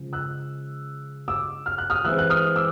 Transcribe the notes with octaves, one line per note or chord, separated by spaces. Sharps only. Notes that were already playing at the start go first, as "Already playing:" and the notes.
Already playing: C#3 F3 G#3 C#4
E6 F#6
D6 E6
F6
F#6
D#6 F6
E3 G#3 C4 E6 F#6
F#6
D#6 F6
D6 E6